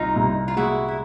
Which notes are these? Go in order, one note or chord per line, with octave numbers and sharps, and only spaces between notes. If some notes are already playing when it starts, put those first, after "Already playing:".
Already playing: C2 D#4 F4
C2
F4
G#3 E4 F#4
E4